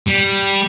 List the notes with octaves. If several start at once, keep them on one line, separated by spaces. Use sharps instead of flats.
G3